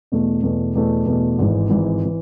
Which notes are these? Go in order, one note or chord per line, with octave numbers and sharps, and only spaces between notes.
E2 B2 A3
E2 B2 A3
E2 B2 A3
E2 B2 A3
G#1 G#2 E3
G#1 G#2 E3
E3